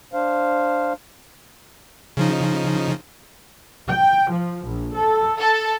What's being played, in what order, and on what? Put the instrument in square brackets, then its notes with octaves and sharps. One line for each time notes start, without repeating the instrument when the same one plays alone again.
[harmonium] D4 C5 F5
[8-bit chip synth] C#3 F3 D#4
[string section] G5
F3
A#1
A4
A4